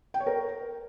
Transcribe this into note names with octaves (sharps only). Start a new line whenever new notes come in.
G5
C#5
A#4